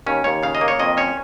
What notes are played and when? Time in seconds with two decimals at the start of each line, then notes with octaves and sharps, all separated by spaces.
0.06 D#2 C#4
0.24 D#2 C#5
0.43 C#3 F5
0.55 D#5
0.61 A#3
0.68 C#5
0.79 F2 D#5
0.97 C#4 C#5